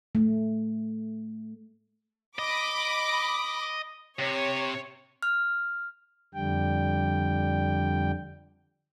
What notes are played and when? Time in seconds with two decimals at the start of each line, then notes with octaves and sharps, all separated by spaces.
0.15 A3
2.39 D#5 B5 D6
4.19 C3 C#5
5.23 F6
6.34 F2 D3 G3 G5